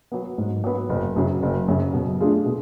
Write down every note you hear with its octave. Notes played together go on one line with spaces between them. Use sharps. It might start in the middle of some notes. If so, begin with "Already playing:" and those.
F#3 B3
G#2
F#3 B3
F#1
F#2 C#3 F#3
F#1
F#2 C#3 F#3
B2
A3 D4 F4 G#4
B2